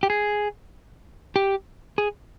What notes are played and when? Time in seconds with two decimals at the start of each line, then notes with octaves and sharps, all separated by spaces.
0.03 G4
0.10 G#4
1.36 G4
1.98 G#4